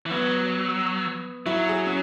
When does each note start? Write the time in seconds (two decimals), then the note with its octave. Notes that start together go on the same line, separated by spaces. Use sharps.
0.06 E3
0.11 F#3 B3
1.46 F#3 E4
1.69 G#4
1.87 C#4